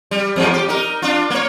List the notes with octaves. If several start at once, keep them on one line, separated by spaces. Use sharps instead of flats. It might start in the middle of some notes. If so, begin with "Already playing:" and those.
G3
E2 G#2 F3
G4
D#4 A#4
D4 F4
A#3 C#5